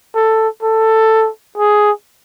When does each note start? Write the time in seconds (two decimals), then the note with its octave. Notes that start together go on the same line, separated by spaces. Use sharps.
0.15 A4
0.63 A4
1.58 G#4